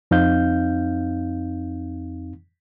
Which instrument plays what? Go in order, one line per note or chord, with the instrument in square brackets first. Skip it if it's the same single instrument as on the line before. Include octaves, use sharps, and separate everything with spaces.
[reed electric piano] F2 C4 D#4 F5 G6